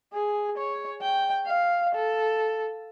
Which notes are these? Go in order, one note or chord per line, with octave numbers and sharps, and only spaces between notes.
G#4
C#5
G5
F5
A4